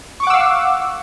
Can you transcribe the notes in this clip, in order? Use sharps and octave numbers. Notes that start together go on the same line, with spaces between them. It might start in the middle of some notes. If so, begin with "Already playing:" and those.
F5 F#5 C#6 D6 E6